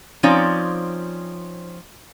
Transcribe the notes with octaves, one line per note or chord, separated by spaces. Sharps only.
F3 C4 C#4 D#4 C#5 D5